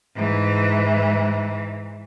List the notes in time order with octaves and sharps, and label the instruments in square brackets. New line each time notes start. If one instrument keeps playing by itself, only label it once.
[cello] G#2 E3